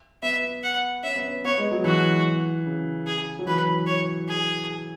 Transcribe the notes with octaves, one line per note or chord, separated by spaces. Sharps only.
B3 E5
F#5
C#4 E5
B3
C#4
B3 C#5
G#3
F#3
E3 F#4
C#3
G#4
F#3
E3 B4
C#5
G#4